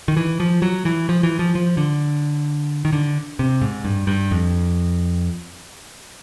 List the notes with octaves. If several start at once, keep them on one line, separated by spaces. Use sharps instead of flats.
D#3
E3
F3
F#3
E3
F3
E3
F3
F3
D3
D#3
D3
C3
G#2
G2
G2
F2